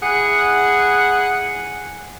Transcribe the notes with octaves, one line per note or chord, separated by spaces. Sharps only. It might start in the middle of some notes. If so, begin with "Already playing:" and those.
E4 G#4 F#5